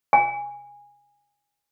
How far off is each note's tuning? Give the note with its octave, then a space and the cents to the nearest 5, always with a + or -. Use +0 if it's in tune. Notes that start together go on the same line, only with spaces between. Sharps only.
G#5 -20